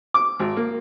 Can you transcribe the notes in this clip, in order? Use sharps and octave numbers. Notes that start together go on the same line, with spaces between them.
D6
G#1
A#3